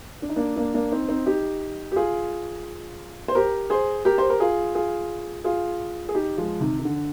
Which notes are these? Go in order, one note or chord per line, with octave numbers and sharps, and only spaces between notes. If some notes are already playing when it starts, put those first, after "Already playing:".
D4
D#4
A#3 D4
A#3 D4
A#3 D4
C4 D#4
C4 D#4
D#4 G4
G4
F4 G#4
C5
G4 A#4
G#4 C5
G4 A#4
C5
A#4
F4 G#4
F4 G#4
F4 G#4
G#4
D#4 G4
F3 G#3
C3 D#3
D#3
D3